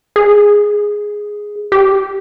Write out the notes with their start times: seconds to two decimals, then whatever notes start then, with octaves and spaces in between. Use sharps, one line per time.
0.16 G#4
1.72 G4